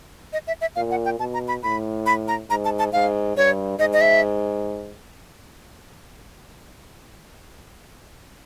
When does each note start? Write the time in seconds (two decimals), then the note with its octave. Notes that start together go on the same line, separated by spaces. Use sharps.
0.33 D#5
0.47 E5
0.61 E5
0.76 A#2 F5
0.91 F#5
1.05 G5
1.20 B2 A5
1.34 A#5
1.48 B5
1.63 A2 B5
2.06 B5
2.28 A#5
2.50 G#2 A#5
2.65 A5
2.79 A5
2.93 G#2 F5
3.37 G2 C#5
3.79 G#2 D#5
3.93 D#5
4.01 E5